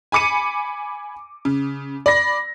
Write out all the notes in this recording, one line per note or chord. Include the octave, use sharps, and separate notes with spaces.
G#5 B5 D6 C#7 D#7
C#3
D5 B5 A#6